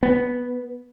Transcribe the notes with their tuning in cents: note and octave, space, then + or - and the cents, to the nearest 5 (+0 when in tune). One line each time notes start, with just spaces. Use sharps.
B3 -5